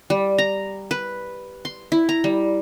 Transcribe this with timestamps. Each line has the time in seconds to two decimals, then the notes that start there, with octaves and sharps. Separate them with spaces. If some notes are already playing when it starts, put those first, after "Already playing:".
0.10 G3
0.38 A#5
0.91 B4
1.65 C6
1.92 E4
2.09 A#5
2.24 G3